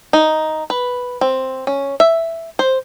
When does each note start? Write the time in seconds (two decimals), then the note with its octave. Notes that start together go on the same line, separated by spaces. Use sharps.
0.13 D#4
0.70 B4
1.21 C4
1.67 C#4
2.00 E5
2.59 C5